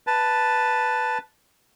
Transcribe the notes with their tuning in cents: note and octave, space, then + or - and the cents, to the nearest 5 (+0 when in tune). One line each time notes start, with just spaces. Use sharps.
B4 +0 A5 +0